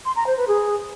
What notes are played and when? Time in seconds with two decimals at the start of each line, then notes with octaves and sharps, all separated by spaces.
0.05 C6
0.16 A#5
0.26 C5
0.37 B4
0.48 G#4